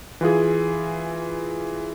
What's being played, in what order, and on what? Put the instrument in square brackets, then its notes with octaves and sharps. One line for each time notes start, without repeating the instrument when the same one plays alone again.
[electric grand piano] E3 F4 G#4